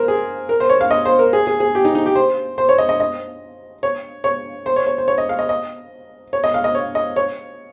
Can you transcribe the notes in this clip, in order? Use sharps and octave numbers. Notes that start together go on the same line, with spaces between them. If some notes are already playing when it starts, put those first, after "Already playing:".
Already playing: A#4 C5
G#4
A#4
C5
C#5
F5
D#5
C5
A#4
G#4
G#4
G#4
G4
D#4
D#4
G4
C5
C5
C#5
D#5
D#5
D#5
C#5
C#5
C5
C#5
C#5
C5
C#5
D#5
F5
D#5
D#5
C#5
D#5
F5
D#5
C#5
D#5
C#5